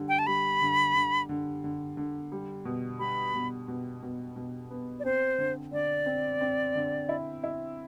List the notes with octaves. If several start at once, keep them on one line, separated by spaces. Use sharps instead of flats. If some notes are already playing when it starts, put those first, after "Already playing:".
Already playing: D3 G3
G5
A5
G3 B5
D3
D3
D3
D3
D3
G3
B2
G3 B5
B2
B2
B2
B2
B3
D5
C4 C5
D3
D3 D5
C4
C4
D3
E4
E4